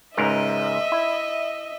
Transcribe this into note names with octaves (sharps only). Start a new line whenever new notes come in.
C#2 G#2 A#4 D#5 E5
E4